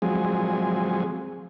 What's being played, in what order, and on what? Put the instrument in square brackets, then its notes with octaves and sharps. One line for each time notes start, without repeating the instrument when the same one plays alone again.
[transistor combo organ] F3 F#3 G#3 C4 G#4